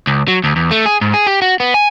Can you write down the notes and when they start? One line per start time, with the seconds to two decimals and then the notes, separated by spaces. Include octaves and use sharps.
0.07 C#2
0.28 F#3
0.44 D2
0.56 E2
0.71 A3
0.86 G#4
1.01 G#2
1.14 G#4
1.27 G4
1.42 F#4
1.60 B3
1.74 G#5